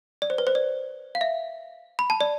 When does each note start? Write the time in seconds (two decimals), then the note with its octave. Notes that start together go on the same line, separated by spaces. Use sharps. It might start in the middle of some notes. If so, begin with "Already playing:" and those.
0.22 D5
0.30 C5
0.38 B4
0.47 C5
0.55 D5
1.15 F5
1.21 E5
1.99 B5
2.10 A5
2.21 D5